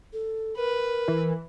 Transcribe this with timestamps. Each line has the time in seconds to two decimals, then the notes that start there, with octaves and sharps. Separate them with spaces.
0.13 A4
0.57 A#4 B4
1.08 E3